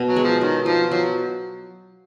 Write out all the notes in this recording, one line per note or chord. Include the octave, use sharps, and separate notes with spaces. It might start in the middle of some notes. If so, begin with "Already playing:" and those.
Already playing: B2
F#3
G#3
F3
D#3 F#3
F3 F4
F3 F#3